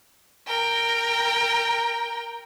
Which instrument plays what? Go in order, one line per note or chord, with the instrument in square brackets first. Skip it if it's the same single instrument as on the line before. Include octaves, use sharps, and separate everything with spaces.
[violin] A#4 G5